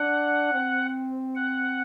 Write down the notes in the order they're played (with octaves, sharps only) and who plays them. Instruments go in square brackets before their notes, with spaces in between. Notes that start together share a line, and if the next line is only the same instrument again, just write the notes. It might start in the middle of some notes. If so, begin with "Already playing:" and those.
Already playing: [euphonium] D4 [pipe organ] F#5
[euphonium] C4
[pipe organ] F#5